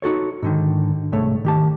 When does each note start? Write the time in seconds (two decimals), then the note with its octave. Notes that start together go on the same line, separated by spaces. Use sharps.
0.02 D#4 F#4 A4 C#5
0.43 G#2 D3 D#3
1.12 C2 G#2 A3 C#5
1.45 D#3 G4 A5